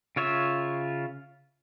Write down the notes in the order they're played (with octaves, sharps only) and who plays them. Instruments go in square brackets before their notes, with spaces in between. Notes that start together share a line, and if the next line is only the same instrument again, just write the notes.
[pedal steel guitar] C#3 F4 C#5 E5